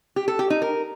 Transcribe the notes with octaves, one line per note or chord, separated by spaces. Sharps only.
G4
A4
G4
D#4
A#4